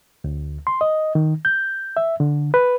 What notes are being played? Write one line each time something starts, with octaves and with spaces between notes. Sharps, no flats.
D2
C6
D#5
D#3
G6
E5
D3
B4